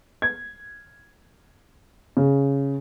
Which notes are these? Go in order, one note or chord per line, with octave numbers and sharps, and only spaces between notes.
G#6
C#3